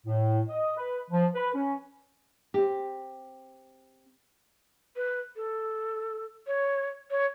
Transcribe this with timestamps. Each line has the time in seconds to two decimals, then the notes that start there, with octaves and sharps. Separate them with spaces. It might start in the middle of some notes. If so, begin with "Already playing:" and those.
0.07 A2
0.49 D#5
0.77 B4
1.11 F3
1.35 B4
1.54 C#4
2.54 C4 G4
4.96 B4
5.36 A4
6.47 C#5
7.11 C#5